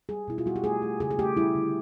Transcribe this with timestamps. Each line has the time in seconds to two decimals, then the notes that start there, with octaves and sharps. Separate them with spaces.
0.09 G3 G#4
0.28 B2 E4
0.38 F4
0.46 G3 F#4
0.56 G4
0.64 A3 G#4
0.82 A3
1.00 C#3 G#4
1.11 G#4
1.19 A3 G4
1.37 G3 E4
1.55 D3